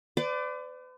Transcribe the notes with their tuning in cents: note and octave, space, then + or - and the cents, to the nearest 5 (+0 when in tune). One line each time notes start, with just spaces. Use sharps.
B4 +45 D5 +0